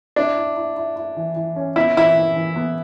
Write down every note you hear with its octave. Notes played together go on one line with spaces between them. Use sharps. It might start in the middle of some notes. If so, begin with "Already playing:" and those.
D4 E4
E4
E4
E4
E4
E3
E3
C#4
B3 E4
E3 E4
E3
E3
B3